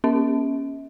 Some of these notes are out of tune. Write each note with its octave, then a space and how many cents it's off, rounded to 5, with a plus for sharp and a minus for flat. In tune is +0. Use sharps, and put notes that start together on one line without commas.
A#3 +45 C#4 +0 E5 -40